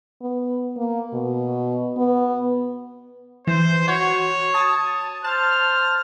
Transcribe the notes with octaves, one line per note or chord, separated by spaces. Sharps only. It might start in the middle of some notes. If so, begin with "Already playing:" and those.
B3
A#3
B2
B3
E3 C5
F#4 C#5
A5 D#6
C5 A5 F6